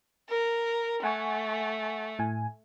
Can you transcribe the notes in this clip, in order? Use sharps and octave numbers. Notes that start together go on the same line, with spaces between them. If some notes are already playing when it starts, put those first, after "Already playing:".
A#4
A3 F#5 G#5 C#6
A2 G#5